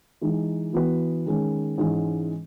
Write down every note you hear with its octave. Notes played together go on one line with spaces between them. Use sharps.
E3 G#3 D#4
E3 B3 F#4 B4
D#3 G#3 C#4
G#2 E3 G#3 C#4